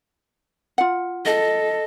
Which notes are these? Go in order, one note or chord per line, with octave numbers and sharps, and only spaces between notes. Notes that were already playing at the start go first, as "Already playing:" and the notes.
F4 F#5
A4 D#5